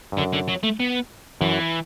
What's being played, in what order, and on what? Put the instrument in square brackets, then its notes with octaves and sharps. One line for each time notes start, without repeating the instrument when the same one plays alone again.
[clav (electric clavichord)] G2
[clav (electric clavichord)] F#2 [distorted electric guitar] D3
[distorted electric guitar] D3
F#3
A3
B3
[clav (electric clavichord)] F#2 [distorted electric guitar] E3